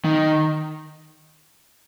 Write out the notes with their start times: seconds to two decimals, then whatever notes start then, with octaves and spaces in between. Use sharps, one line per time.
0.05 D#3